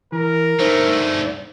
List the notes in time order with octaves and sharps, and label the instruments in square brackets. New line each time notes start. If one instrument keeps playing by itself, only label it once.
[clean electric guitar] E3 [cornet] A#4
[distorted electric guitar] G2 A3 [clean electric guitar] D#4 C5